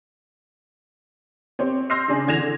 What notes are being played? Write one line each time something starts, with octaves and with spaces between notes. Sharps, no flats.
C4 G4 C5 C#5
C6 E6 F6 G6 A#6 C7
C#3 D4 G#4
D3 E3 G#6 A#6 E7 F7